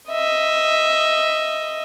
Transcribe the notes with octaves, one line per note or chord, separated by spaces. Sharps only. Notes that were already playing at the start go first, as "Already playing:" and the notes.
D#5 E5